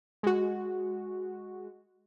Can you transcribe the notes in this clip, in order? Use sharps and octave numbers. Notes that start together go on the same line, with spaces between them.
G#3 F#4